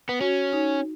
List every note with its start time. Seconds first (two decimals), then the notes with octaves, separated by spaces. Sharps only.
0.09 B3
0.21 C#4 F#4
0.53 D#4